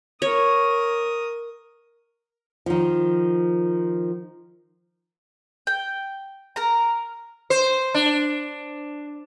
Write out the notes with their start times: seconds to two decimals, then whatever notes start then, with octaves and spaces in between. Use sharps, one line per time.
0.22 A#4 C#5 D#6
2.66 D#3 F3
5.67 G5
6.56 A#4 A#5
7.50 C5
7.94 D4